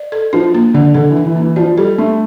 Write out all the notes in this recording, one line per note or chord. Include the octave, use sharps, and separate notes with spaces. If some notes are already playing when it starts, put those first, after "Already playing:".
Already playing: D5
A4
F3 D4
A#3
D3 D5
D3 A4
E3
D4
E3
A#3
E3
F3 D5
G3 A4
A3 D4